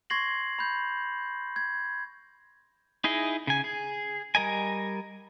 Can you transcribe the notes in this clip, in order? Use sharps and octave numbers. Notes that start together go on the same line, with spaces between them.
C6 C#6 G#6 A#6 C7 F#7
B5 G6
G#6
D#4 E4 G#4 D#5
C#3 G#5
G#4
G3 A#4 D#5 G#5